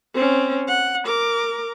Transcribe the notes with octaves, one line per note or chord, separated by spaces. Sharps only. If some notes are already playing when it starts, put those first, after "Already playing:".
C4 C#4
F#5
A#4 D6